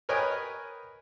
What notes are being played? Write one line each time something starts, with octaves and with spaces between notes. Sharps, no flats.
A#4 B4 C#5 D#5 G5 G#5